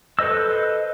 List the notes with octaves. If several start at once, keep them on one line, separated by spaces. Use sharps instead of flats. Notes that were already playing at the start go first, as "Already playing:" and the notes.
A4 B4 C5 D#5 E6